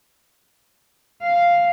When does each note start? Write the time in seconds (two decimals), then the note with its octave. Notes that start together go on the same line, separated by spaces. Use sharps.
1.23 F5